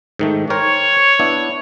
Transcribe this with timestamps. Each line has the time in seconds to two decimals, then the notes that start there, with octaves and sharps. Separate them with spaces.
0.19 G#2 D#3 A3
0.50 A#4 C5 C#5 G5
1.20 B3 D4 E4